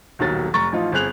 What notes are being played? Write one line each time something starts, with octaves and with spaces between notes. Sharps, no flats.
D#1 B1 D#3 F#3 A6
F1 A#5 C#6 A6
A1 F3 D#4 F4
G1 C4 G#4 F#6 F7